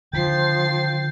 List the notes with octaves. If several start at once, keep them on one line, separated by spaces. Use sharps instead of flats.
D3 D#3 F3 G5 A6 C7